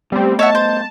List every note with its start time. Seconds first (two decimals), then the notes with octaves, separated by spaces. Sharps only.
0.12 G3 A3 B3 C4
0.39 C#5 D#5 E5 F#5 A5
0.55 C5